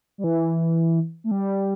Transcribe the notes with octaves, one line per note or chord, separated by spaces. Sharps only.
G3
E3
A3
G3